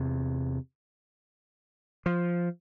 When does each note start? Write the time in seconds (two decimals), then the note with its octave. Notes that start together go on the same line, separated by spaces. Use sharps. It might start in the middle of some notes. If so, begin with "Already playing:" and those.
Already playing: E2 C3
2.06 F3